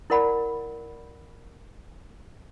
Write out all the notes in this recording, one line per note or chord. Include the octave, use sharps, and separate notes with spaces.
E4 A#4 D5 F#5 B5